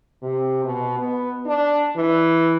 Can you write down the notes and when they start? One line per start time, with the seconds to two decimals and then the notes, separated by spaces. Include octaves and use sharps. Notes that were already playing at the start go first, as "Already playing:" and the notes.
0.22 C3
0.64 B2
0.98 B3
1.46 D4
1.96 E3